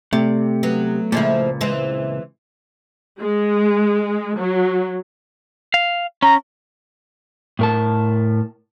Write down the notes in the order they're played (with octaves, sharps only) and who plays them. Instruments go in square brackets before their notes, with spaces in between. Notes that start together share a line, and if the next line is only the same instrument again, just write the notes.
[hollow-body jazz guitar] C3 [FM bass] A3 [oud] D5
[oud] F#3 B3
[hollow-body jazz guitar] C#2 A#2 [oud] F3 G#3 E4
[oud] E3 G#3 C4
[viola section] G#3
F#3
[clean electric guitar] F5
[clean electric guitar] C#4 [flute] A#5
[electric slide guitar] A2 A#4 A5